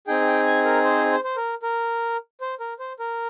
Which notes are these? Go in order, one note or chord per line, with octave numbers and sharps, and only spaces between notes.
C4 D#4 G#4 G5
G5
G#5
A#4
C5
C5
C5
A#4
A#4
C5
A#4
C5
A#4